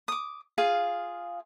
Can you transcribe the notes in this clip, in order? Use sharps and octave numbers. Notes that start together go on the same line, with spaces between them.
D6 D#6
F4 G#4 F5